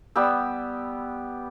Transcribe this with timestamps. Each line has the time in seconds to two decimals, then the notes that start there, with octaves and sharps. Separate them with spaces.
0.16 G3 B3 G4 E6